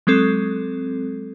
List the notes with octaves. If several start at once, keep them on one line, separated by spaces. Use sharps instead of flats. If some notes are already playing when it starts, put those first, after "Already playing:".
F#3 G#3 C4 A4